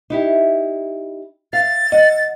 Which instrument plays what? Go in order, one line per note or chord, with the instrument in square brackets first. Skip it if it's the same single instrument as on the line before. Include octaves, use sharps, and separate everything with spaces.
[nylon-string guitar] D#4 E4 G4
[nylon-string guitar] F5 [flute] A6
[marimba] D#5 [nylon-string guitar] F#5